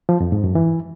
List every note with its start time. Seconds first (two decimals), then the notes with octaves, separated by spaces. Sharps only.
0.09 F3
0.20 F2
0.32 G#2
0.44 F#2
0.55 E3